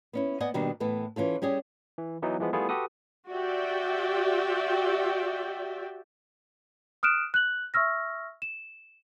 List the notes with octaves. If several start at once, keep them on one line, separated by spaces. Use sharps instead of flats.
B3 C#4 E4
B3 D5 D#5 F#5 G#5
D#2 B2 D#3 G3 D4 D#4
A2 E3 B3 A4
E3 C#4 F4 A4
G3 C#4 G4 G#4
E3
E3 F#3 B3 D#4
E3 F3 G#3 B3
G3 A3 B3 E4 F4 G#4
F#4 G4 A4 B4 D#6
F#4 G4 D5 E5 G5
D#6 F6 F#6 D7 E7
F#6 F#7
E5 C#6 E6 F6 A#6
E7